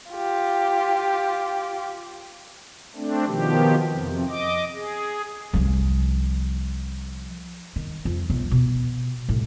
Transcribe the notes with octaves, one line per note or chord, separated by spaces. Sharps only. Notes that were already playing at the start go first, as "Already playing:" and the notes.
F4 G4
A3 C4 D4
B2 D#3 F3 G4
F2 C3
D#5 D6
G#4
C2 F3
D#3
F2
B1
B2
C2 A2